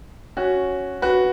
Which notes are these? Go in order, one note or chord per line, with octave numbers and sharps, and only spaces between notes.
C#4 F#4
F#4 B4